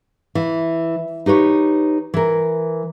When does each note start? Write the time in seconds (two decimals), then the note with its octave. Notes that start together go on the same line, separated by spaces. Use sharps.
0.35 E3
1.26 D#4 G4 B4 C#5
2.14 E3 A#4